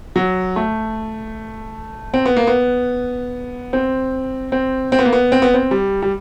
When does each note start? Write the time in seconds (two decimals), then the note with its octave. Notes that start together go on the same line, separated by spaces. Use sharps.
0.16 F#3
0.56 A3
2.14 C4
2.26 B3
2.37 A#3
2.47 B3
3.73 C4
4.52 C4
4.92 C4
4.99 B3
5.05 A#3
5.13 B3
5.32 C4
5.42 B3
5.54 C4
5.71 G3
6.02 G3